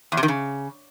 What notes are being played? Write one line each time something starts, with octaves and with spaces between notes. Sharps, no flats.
E2
C3
D#3
C#3